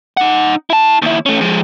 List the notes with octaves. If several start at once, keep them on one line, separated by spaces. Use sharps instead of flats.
D#4 F#5
E4 A5
D#2 E4
A3 C#4
F3 G#3